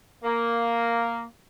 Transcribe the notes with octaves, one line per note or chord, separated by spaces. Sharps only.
A#3